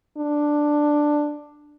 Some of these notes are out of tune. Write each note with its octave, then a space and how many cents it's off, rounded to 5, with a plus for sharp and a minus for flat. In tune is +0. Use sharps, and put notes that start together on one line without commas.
D4 +5